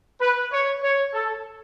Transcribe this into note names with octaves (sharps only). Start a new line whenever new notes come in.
B4
C#5
C#5
A4